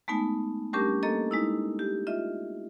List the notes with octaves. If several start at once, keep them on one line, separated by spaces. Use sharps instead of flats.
G#3 A3 B3 D#4 G#5
G3 A3 C#4 D4 G4 A#4
A#3 A4 D#5
G#3 D#4 E4
G4
F4 D#5 E5